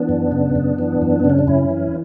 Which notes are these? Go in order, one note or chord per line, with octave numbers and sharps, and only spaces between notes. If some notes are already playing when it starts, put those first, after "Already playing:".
Already playing: E3 B3 D4
F#2
C#3
F#2
E3
F#2
B3
C#3
C#4
D4
F#2 C#4 E4
E3